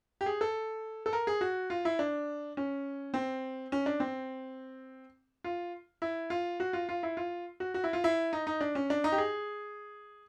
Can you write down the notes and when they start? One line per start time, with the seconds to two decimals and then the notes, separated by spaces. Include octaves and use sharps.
0.21 G4
0.26 G#4
0.41 A4
1.06 A4
1.13 A#4
1.27 G#4
1.41 F#4
1.70 F4
1.85 E4
1.99 D4
2.57 C#4
3.14 C4
3.72 C#4
3.86 D4
4.00 C4
5.44 F4
6.02 E4
6.30 F4
6.60 F#4
6.73 F4
6.89 F4
7.03 E4
7.17 F4
7.60 F#4
7.74 F#4
7.84 E4
7.93 F4
8.04 E4
8.33 D#4
8.47 D#4
8.61 D4
8.75 C#4
8.90 D4
9.04 D#4
9.12 G4
9.18 G#4